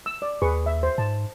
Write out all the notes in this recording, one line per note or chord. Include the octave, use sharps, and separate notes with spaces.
E6
D5
D#2 G#4 B4 C#6
E5
C5
G#2 A5